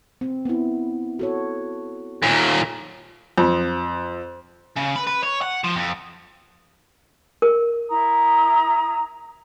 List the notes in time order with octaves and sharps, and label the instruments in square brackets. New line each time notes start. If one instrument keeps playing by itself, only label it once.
[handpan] C4
B3 E4
F#4 A4 C#5
[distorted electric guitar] D#2 A#2
[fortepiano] F2
[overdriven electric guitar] C#3
B4
B4
C#5
F#5
F3
F2
[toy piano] A#4
[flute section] E4 A#5 D#6